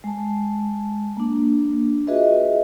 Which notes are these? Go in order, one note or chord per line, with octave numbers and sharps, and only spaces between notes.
G#3 A5
A#3 D4
F4 F#4 G#4 B4 D#5 E5